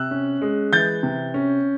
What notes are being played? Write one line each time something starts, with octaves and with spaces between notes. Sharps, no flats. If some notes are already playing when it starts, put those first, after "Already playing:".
Already playing: C3 E6 F#6
C#4
G#3
E3 G6 A6
C3
C#4